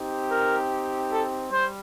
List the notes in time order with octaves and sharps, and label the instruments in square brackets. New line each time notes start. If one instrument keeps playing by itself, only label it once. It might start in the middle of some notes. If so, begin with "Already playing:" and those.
Already playing: [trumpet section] C4 D#4 G4
A#4
A4
G3 C5